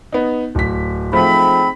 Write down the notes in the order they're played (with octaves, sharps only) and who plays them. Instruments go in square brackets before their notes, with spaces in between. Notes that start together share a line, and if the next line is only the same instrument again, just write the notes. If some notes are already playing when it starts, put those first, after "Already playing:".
[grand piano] B3 D#4
D1 B6
[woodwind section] G#2 C4 B5 [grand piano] F3 A3